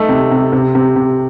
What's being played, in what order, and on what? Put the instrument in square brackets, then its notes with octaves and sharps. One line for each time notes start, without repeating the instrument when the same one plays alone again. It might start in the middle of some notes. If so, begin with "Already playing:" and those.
Already playing: [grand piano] A3 D#4
C3
C3
C3
C3
C3